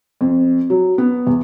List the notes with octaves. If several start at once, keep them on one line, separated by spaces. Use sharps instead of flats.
F2
F#3
B3
E2